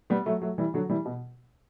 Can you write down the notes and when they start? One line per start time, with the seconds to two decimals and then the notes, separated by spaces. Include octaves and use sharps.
0.10 G3 B3
0.26 F#3 A3
0.42 F#3 A3
0.58 E3 G3
0.74 D3 F#3
0.90 E3 G3
1.05 B2